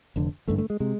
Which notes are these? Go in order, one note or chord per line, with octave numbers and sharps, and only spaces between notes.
F1 F2 D3
A1 G2 D3 A3
A3
G#3
C3 G#3